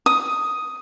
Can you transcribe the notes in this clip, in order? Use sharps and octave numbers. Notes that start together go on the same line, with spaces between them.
D#6